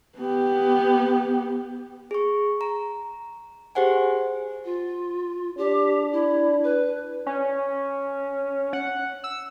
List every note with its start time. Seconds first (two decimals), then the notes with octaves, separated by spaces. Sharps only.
0.18 B3 G4
2.11 G#4 C#6
2.61 A#5
3.75 G4 G#4 C5 F#5 G#5
4.65 F4
5.58 D4 G4
6.13 E4
6.64 B4
7.26 C#4
8.73 F#5
9.24 E6